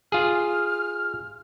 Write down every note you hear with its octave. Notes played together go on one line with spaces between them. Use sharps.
F4 G#4 F6